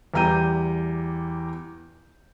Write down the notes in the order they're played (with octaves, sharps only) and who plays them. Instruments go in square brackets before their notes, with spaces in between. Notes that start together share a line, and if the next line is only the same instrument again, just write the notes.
[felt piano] E2 G3 A#5 G6 D#7